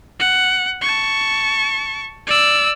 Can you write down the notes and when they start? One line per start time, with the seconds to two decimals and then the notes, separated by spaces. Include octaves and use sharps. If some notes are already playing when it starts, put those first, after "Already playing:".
0.20 F#5
0.81 A5 C#6
2.27 D5 E6